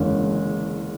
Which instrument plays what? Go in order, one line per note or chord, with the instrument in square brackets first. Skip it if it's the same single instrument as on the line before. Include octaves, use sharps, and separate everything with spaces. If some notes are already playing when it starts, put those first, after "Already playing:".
Already playing: [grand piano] F#1 E2 D3 G#3 C#4